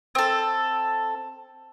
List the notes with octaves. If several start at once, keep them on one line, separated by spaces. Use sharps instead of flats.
C4 A4